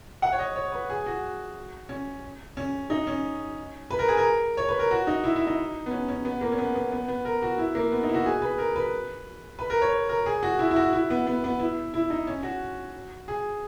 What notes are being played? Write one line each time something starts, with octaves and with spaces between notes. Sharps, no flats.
F#5
C#5
D#5
C#5
B4
G#4
F#4
C#4
C#4
D#4
C#4
B4
A#4
G#4
A#4
C#5
B4
A#4
F#4
D#4
E4
E4
D#4
B3
C#4
C#4
B3
A#3
C#4
B3
B3
B3
B3
A#4
F#4
E4
A#3
B3
D#4
E4
F#4
G#4
B4
A#4
B4
B4
A#4
C#5
A#4
G#4
F#4
E4
E4
F#4
E4
B3
B3
B3
E4
E4
D#4
C#4
F#4
G#4